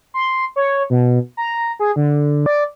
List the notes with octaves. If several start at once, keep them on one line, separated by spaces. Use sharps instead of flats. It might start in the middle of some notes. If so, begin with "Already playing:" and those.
C6
C#5
B2
A#5
G#4
D3
D5